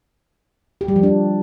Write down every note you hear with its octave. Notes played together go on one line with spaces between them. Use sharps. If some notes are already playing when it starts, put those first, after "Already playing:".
G4
G3
F3
D4